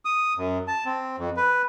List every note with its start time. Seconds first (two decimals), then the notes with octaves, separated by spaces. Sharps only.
0.05 D#6
0.37 F#2
0.68 A5
0.85 C4
1.18 F2
1.37 B4